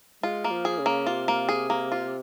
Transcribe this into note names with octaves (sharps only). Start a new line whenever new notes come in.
G#3 F4
A#3
F3
G#4
C#3
A#3
C3 F4
A#3
G#4
A#3
F4